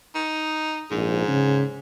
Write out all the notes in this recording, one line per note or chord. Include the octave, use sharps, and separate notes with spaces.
D#4
A#1 G#2
C#3